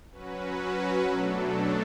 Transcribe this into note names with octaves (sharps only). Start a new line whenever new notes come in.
F#3 C#4 F#4 B4
B2 F#3 A3 D4 A4